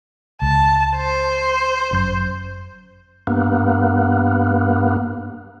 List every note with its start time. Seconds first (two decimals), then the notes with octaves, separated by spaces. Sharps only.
0.42 C#2 A5
0.97 C5
1.91 G1 F#2 G6
3.27 G2 A#3 B3